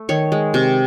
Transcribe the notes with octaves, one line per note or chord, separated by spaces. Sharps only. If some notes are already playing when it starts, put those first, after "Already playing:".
Already playing: A3
D#3 C#5
G#3
C3